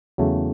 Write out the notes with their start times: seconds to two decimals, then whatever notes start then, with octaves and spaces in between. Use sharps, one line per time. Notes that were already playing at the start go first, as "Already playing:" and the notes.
0.18 E2 C#3 F#3 A3